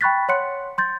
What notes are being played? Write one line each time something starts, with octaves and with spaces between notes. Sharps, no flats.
G5 B5 C#6 F#6 A6 B6
C#5 F#5 C6 F#6 C#7
C6 G6 A6